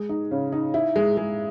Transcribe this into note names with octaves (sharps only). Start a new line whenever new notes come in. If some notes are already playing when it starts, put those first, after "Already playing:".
Already playing: G#3
D#4
C#3
D#4
E4
G#3
G#3